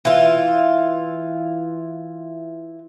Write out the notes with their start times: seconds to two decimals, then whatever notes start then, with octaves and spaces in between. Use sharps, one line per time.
0.05 E3 F4